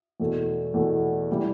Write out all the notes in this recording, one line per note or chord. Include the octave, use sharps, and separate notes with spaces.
E2 B2 A3
E2 B2 A3
E3 G3